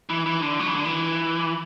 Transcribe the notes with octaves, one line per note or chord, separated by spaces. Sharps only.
E3
E3
D3
F#3
E3
D3
E3